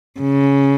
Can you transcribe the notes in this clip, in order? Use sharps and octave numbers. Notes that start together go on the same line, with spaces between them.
C#3